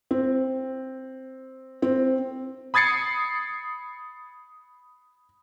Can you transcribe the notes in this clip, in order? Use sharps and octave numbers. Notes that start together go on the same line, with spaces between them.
C4
C4
B5 D#6 G#6 A6 C7 C#7